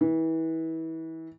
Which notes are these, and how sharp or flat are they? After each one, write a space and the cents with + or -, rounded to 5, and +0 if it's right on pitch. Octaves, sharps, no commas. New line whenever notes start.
E3 -30